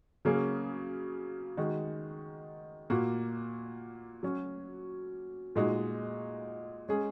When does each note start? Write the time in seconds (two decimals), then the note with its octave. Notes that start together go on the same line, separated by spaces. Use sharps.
0.25 C#3 F#3 A#3 C#4 G#4
1.57 D#3 G#3 D#4 F#4
2.90 A#2 A#3 F#4
4.23 F#3 C#4 F#4
5.55 A#2 G#3 D#4 F#4
6.89 G#3 C#4 G#4